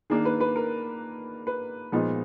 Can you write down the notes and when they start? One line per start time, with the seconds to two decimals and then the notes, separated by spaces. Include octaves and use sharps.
0.10 D#3 A#3 D4 G#4
0.25 B4
0.41 B4
0.56 A#4
1.47 B4
1.92 A#2 F3 G#3 B3 D#4